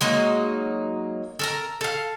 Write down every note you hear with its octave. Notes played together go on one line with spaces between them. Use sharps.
F#3 G#3 A#3 D#4
A4 A#4 A#5
A4 F5